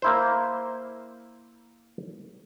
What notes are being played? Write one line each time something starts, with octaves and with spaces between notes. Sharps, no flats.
A#3 E4 C5